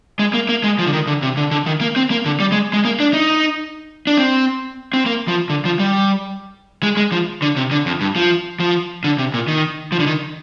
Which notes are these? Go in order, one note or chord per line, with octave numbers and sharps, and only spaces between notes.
G#3
A#3
A#3
G#3
F3
D3
D#3
D3
C3
D3
D3
D#3
A#3
C4
A#3
D3
G3
G#3
G#3
A#3
D4
D#4
D4
C4
C4
A#3
F3
D3
F3
G3
G#3
G#3
F3
D3
C3
D3
F2
G2
F3
F3
D3
C3
A#2
D#3
F3
D3
D#3